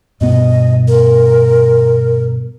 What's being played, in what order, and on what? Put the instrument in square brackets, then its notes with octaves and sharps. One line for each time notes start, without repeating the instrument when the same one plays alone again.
[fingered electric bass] G2 B2 B3 [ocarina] D#5
[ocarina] A#4